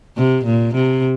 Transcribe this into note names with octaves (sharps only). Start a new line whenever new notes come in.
C3
A#2
C3